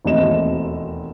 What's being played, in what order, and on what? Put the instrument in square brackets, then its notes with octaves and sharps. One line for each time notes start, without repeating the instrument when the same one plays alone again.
[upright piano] E1 D#2 A3 C4 D#5 E7